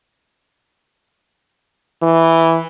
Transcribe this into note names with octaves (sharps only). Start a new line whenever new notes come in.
E3